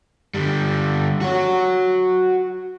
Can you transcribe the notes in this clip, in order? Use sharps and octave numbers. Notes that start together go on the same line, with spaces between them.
D3 G3
F#4 C#5